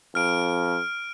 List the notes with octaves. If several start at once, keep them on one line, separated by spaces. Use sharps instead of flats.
F2 F6 D7